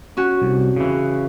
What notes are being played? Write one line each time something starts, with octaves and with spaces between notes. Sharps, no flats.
C#4 F#4
C2
C#3 E3